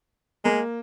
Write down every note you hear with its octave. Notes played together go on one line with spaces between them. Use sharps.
G#3 A#3